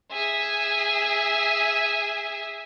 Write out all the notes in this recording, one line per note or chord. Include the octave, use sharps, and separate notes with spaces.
G#4 E5